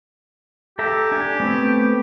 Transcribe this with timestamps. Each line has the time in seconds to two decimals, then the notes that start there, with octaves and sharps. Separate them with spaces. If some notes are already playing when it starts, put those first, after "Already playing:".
0.79 G4 A4 E5 A#5
1.12 D4 G#5
1.40 A3 B3 C4